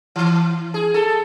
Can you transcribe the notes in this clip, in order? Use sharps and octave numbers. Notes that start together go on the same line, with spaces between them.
E3
G#4
A4